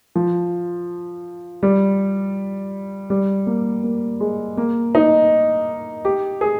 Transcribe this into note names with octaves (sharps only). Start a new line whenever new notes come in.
F3
G3
G3
A#3
A#3
G#3
A#3
D#4
G4
G#4